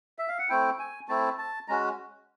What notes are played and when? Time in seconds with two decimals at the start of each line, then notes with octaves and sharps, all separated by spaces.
0.19 E5
0.28 F5
0.39 F#5
0.49 A3 C4 E4 G5
0.79 G#5
1.09 A3 C4 E4 A5
1.38 A5
1.68 G#3 C#4 F#4 A#5